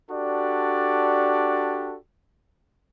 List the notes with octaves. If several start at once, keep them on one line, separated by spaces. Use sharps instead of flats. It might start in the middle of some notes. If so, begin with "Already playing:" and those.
D4 F#4 G4 A4 D5